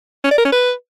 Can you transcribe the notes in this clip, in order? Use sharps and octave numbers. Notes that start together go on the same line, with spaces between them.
C#4
D5
A#4
C#4
B4